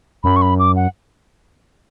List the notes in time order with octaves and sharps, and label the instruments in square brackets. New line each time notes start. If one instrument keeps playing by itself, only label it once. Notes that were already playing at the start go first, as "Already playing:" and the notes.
[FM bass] F#2 [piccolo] B5
[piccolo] C#6
B5
D6
F#5